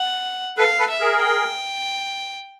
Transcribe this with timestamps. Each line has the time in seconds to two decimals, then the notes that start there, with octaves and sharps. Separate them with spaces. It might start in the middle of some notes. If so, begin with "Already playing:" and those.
Already playing: F#5
0.57 A4 B4 F5
0.79 A4 B4
0.90 E5
1.00 G#4 A#4
1.22 G5